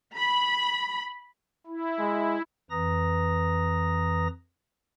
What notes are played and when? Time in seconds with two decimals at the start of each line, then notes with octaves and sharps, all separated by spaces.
0.16 B5
1.67 E4
1.99 G#3
2.70 F2 E3 B4 A#5 D#6 A#6